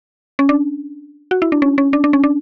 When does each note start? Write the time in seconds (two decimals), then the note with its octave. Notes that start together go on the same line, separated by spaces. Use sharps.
0.39 C#4
0.49 D4
1.31 F#4
1.42 E4
1.52 D4
1.62 C#4
1.78 C#4
1.93 D4
2.04 D4
2.13 C#4
2.24 D4